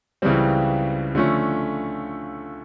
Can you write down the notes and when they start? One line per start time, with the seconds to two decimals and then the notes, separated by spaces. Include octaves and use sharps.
0.22 C#2 C#3 E3 G3 C4
1.15 D3 F3 A3 C#4